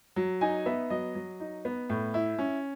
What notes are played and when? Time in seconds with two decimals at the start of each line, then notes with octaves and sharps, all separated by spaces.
0.16 F#3
0.41 D#4 G#5
0.66 B3 E5
0.90 F#3 D#5
1.15 F#3
1.40 D#4
1.65 B3
1.90 A2
2.14 E4
2.39 C#4